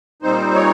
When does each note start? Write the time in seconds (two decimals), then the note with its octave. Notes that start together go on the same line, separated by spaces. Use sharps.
0.22 A#2 G3 C4 D#4 C5
0.55 C#5